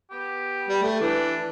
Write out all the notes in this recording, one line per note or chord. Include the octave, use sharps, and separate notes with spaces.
B3 G4
G3
A3
E3 D4